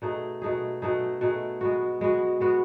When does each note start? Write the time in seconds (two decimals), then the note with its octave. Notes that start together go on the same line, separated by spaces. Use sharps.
0.02 B2 A3 D#4 G#4
0.42 B2 A3 D#4 G#4
0.82 B2 A3 D#4 G#4
1.21 B2 A3 D#4 G#4
1.61 G#3 B3 F#4
2.01 G#3 B3 F#4
2.41 G#3 B3 F#4